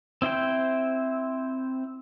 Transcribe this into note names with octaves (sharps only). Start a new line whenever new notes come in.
C4 E4 C5 G5